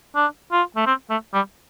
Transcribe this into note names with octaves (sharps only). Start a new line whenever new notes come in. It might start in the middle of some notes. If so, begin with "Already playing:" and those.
D4
F4
A3
C4
A3
G3